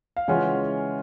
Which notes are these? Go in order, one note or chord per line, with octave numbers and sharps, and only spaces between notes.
F5
C#3 E3 G#3 C#4 F4 F#5